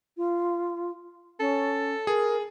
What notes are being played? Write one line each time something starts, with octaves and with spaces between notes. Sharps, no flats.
F4
C#4 A4
G#4 A#4